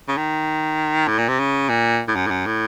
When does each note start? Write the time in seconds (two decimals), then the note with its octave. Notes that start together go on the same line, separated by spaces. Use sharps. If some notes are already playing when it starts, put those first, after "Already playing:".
0.08 C#3
0.17 D#3
1.07 A2
1.18 A#2
1.28 C3
1.39 C#3
1.69 A#2
2.08 A2
2.15 F#2
2.26 A2
2.30 F#2
2.46 A2